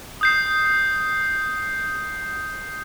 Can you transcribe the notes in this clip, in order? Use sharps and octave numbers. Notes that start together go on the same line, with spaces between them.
D#6 G6 C7